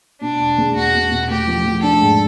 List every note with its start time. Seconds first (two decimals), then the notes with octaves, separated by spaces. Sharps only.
0.21 B2 D4
0.40 E1
0.58 E2
0.75 E1 F#4
0.94 B2
1.11 B2
1.29 A3 G4
1.47 F3
1.65 F3
1.83 D4 A4
2.00 G#2